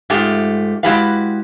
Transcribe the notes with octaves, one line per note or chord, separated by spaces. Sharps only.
G#2 G#3 A3 F4 G4
G#3 E4 F#4 G4 B4 F5